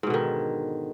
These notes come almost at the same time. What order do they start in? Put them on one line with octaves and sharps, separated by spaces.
G#2 B2 D3 D#3